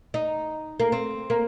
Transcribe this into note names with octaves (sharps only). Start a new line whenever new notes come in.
D#4
A#3
C4
A#3